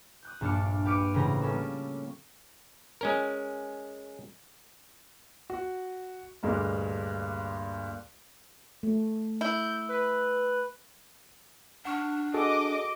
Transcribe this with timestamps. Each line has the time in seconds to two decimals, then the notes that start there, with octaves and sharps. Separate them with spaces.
0.23 D#6 F#6 G6
0.41 A#1 G2 D4 A5 F6 C#7
0.85 G4 B4 D6 F6 C#7 D#7
1.14 A1 C#3 F4 B4 C5 A#5
1.42 G3 A#3 C#4 A4
3.01 G#3 C#4 A#4
5.50 F#4
6.43 D2 G2 A#2 G#3 A#3 D4
8.83 A3
9.41 E4 G6
9.89 B4
11.85 D4 F#5 C#6 F6
12.34 F#4 G#4 A4 D#5 D6